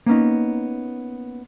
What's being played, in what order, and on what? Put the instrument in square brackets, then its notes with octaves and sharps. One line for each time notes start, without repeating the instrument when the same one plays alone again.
[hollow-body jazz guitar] A#3 B3 C#4 D#4